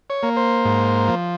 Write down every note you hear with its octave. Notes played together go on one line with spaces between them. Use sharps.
C#5
A#3
C5
G#2
F3